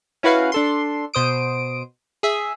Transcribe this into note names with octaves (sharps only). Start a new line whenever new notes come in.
C#4 E4 F#4 B4 F5
D4 A4 C6
B2 C5 D#6 D7
G#4 E5